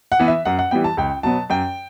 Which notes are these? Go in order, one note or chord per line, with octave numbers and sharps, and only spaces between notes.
F#5
E3 B3
E5
F#2 F#5
F#5
E3 G3 B3 G5
A5
C#2 G5
B2 F#3 B3 A5
F#2 G5